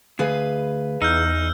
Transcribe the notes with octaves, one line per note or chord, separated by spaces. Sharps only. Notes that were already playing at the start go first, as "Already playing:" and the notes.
D2 G#4 B4 F5
E2 D#4 E6 F6 G6